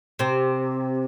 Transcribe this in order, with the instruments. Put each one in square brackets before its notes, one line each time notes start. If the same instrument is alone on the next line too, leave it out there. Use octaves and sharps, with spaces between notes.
[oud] C3 C4